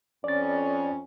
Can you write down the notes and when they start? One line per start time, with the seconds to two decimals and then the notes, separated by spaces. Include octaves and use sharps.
0.24 F2 C#4 D5 A6